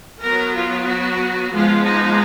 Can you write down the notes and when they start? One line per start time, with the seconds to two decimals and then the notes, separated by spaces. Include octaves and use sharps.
0.21 F#3 B3 A#4
0.54 F4
0.86 F#4
1.52 F3 G#3 B3 F4
1.84 D#4